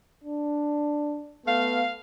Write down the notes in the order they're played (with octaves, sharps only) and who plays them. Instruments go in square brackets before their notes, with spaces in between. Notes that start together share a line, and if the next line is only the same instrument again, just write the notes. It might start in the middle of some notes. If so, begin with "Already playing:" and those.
[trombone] D4
[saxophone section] A3 F5 [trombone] B3